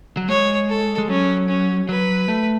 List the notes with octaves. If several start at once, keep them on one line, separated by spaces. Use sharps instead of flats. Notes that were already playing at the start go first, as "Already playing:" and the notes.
F#3
G#3 C#5
A4
G#3
F#3 C#4
C#4
F#3 B4
A3